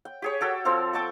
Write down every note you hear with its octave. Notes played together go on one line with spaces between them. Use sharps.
G5
G4 G#4 C#5
F#4 A4 G5
F3 C4 A4 F5
G5 A5 C#6 D6